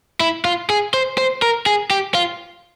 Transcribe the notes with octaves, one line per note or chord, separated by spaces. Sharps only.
E4
F4
G#4
C5
C5
A#4
G#4
G4
F4